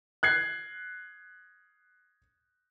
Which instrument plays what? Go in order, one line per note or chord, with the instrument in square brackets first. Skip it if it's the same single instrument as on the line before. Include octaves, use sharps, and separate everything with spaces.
[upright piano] F#6 G#6 C7